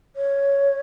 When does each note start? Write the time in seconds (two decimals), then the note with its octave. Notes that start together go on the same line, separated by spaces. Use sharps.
0.16 C#5